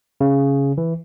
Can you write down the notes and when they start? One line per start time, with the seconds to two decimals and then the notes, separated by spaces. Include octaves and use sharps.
0.21 C#3
0.78 E3